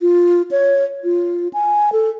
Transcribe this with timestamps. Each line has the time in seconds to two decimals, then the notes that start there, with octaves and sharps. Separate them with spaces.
0.01 F4
0.51 C#5
1.04 F4
1.53 G#5
1.92 A4